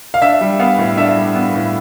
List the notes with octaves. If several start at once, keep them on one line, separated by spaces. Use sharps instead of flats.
F5
D4 E5
G3
B3 F5
A2
D4 E5
G3
B3
A2